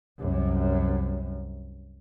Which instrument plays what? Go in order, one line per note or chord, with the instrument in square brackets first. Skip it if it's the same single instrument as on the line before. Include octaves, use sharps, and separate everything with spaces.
[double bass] C2 F#2